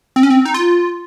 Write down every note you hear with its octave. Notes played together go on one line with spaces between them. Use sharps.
C4
C#4
C4
D#4
F4